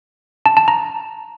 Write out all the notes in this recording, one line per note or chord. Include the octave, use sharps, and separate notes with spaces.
A5
A5
A#5